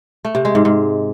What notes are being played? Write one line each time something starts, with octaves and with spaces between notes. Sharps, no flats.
A3
C3
G#3
G#2
G#2